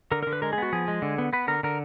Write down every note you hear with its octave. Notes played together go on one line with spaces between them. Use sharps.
D3 A#4
A#4
D3
B4
G#3 A#4
G#4
B3 F#4
F3 G#4
G#3
D3
B3
B3 B4
D3 A#4
D3 A#4